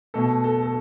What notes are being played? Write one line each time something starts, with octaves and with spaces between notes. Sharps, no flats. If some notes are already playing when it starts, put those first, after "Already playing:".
B2 A3 A4
A4
A4